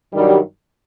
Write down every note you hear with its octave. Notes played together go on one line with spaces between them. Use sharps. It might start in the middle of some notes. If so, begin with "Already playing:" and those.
G2 D#3 F#3 G3